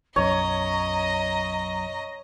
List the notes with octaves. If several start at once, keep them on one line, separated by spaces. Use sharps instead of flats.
B1 F#2 C#5 D#5 A#5